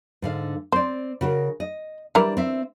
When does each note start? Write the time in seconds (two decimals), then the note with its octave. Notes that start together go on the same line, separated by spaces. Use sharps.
0.22 G#2 D3 F5
0.72 C4 C5 D5
1.21 C#3 F#4 A#4
1.60 D#5
2.15 E3 G3 D4 E4 A#4
2.37 C4 E5